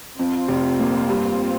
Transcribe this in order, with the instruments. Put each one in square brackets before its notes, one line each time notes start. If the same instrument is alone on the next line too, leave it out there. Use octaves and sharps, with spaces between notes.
[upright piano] F2 [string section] C4 F4
[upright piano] F1
A#3
G2